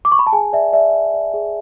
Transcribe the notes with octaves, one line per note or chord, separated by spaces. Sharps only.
D6
C#6
B5
A5
G#4 G#5
D5 E5
D5 E5
D5
D5
G#4